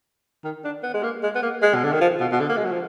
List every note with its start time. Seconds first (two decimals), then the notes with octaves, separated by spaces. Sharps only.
0.44 D#3
0.64 D4
0.83 B3
0.94 G#3
1.03 A#3
1.23 G#3
1.35 B3
1.43 A#3
1.62 G#3
1.75 B2
1.84 D3
1.92 D#3
2.01 F3
2.20 B2
2.32 B2
2.40 D3
2.49 A#3
2.57 G#3
2.64 F#3
2.72 F3